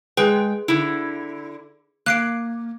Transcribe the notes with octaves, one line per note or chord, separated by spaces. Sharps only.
G#3 G#4 B4 G5
D3 E4
A#3 F#6 C7 D7